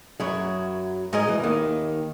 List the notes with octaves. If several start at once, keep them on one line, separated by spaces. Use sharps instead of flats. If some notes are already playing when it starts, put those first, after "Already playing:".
F#2 F#3 E4 G#4 C#5
G#2 G#3 A#4 D#5 G#5 D#6
E2 E3
D#2 D#3